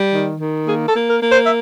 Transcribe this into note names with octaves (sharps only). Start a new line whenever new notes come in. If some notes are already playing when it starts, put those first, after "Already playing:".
Already playing: G3
D#3
D#3
A#3 G#4
A4
A#3
A#4
A#3
C5
E5